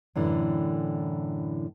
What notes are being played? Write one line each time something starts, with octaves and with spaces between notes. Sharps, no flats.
F#2 A2 D3 E3